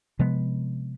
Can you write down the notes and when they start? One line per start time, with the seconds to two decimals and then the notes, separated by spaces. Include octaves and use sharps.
0.19 C3 F3 G#3 B3